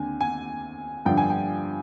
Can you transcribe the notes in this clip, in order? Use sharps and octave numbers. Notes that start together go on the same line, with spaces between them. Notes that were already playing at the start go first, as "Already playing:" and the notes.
Already playing: D#2 D3 C4 G#5
G#5
G2 D3 F3 G5
G#5
G5